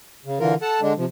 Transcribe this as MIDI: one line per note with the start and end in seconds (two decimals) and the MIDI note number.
0.25 0.39 49
0.40 0.54 50
0.40 0.54 52
0.40 0.54 65
0.40 0.54 70
0.62 0.80 69
0.62 0.80 78
0.62 0.80 81
0.81 0.93 50
0.81 0.93 56
0.81 0.93 62
0.97 1.05 48
0.97 1.05 53